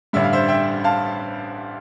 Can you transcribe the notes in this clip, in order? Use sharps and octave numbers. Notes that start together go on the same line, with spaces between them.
A1 G2 D3 G3 E5
F5
C5 E5
E5 G5
F5 A5